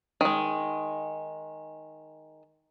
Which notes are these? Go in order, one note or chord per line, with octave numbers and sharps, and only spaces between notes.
D#3 G#3